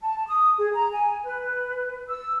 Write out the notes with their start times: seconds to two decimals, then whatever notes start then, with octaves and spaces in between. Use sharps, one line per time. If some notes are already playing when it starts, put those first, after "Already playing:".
0.01 A5
0.27 D#6
0.57 G#4
0.74 A#5
0.92 G#5
1.24 B4
2.08 E6